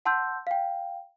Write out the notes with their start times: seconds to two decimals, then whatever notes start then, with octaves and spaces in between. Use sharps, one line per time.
0.05 F#5 A5 C6 E6 G6
0.47 F5 G5